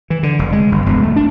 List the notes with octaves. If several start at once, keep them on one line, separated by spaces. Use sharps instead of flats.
E3
D3
F1
G#3
G1
E1
A3
D4